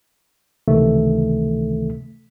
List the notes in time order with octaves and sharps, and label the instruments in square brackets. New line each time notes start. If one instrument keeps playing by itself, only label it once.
[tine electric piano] C#2 C3 D#3 E3 A3